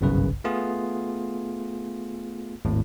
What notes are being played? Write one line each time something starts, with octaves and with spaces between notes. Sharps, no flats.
G1 C2 F#2 C#3 B4
A3 B3 F4 G#4
G#1 D#2 A2